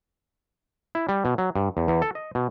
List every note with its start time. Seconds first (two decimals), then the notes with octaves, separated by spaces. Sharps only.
0.95 E4
1.09 G3
1.25 B2
1.38 F#3
1.56 G2
1.77 E2
1.88 E2
2.02 A4
2.15 D#5
2.35 B2